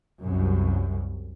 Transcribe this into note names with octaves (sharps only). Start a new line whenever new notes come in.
C2 F#2